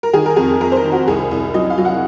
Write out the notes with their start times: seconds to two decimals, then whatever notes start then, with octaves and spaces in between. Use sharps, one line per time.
0.03 A#4
0.13 D#3 G#4
0.26 A#4
0.36 F2 G#4
0.61 F2 A#4
0.72 C5
0.77 A#4
0.84 D#3
0.92 F#4
1.08 C2 G#4
1.31 C2
1.54 F#3 D#5
1.70 F5
1.78 F#3
1.85 F#5